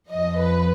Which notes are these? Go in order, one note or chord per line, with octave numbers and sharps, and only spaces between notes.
F2 F3 D#5
B4